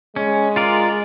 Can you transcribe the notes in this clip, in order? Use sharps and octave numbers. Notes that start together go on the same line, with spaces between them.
G#3 C#4
F4 A#4 D5